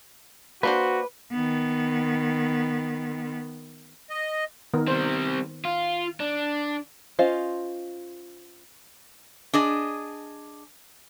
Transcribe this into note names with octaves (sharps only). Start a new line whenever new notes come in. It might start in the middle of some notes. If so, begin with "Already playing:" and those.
A#3 D4 F#4 B4 C5
D#3 B3
D#5
D#3 B3 A#4
G3 C4 C5
F4
D4
C#4 F4 C5 D#5 F5
D4 G#4 D#5